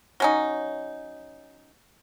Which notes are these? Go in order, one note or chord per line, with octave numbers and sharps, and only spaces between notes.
F#3 C#4 D#4